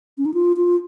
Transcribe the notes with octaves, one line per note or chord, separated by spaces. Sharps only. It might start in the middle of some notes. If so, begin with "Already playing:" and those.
C#4
D#4
F4
F4